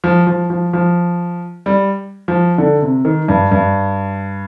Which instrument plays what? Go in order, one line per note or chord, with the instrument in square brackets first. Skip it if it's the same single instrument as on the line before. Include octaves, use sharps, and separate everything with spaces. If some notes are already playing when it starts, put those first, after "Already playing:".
[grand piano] F3
F3
F3
F3
G3
F3
D3
C3
D#3
G2
G2